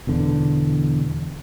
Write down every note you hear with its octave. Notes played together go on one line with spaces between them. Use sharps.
E1 E2 D3